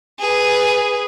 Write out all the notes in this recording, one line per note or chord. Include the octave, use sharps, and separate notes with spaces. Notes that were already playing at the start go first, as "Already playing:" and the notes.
G#4 B4